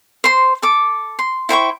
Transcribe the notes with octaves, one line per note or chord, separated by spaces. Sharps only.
C5 C6
A4 D6
C6
E4 C5 G5 C#6